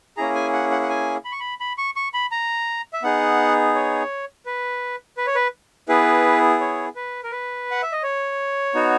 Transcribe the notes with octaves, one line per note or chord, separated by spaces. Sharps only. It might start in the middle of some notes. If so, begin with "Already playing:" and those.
A#3 C#4 E4 G#4 A#5
G#5
F#5
F#5
F#5
G#5
B5
C#6
B5
B5
C#6
C#6
B5
A#5
E5
B3 D#4 G#4 F#5
C#5
B4
B4
C#5
B4
B3 E4 G#4 B4
C#5
B4
A#4
B4
F#5
E5
D#5
C#5
B3 D#4 F#4